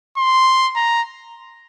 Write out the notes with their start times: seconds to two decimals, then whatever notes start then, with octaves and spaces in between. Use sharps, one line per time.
0.17 C6
0.76 A#5